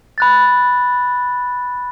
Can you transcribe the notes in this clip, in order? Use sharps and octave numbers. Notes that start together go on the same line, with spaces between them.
B5 F#6 A6